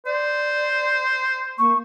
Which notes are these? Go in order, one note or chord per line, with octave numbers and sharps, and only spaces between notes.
C5 D5
A#3 C#6